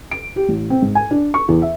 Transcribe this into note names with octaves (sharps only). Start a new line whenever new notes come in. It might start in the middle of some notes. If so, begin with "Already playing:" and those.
D7
G4
A1
C4
G#2
G#5
D4
C#6
E2
E5